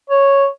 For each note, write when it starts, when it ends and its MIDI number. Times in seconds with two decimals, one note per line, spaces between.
0.10 0.47 73